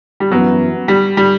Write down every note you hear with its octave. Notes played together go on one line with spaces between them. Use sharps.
G3
F#2 E3 F#3 B3
G3
G3